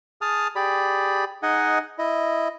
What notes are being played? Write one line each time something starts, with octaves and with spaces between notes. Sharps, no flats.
G#4 A5 D#6 F6
G4 G#4 D5 B5
D#4 G#4 D#5 F#5 G#5
E4 D#5